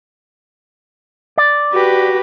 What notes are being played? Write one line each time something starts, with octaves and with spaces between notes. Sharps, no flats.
D5
F#4 G4 B4